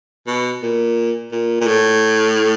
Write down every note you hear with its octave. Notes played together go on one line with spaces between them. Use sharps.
B2
A#2
A#2
A#2
A2